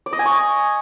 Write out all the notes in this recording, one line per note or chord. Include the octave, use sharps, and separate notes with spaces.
D5
D#5
G#5
C#6